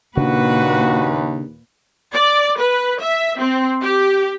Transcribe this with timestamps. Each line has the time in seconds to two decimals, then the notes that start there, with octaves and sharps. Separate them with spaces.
0.17 D#2 A#2 C#3 D4 F#4 B4
2.13 D5
2.58 B4
3.01 E5
3.40 C4
3.81 G4